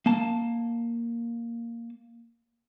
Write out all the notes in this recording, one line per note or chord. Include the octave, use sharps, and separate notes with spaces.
A#3 A5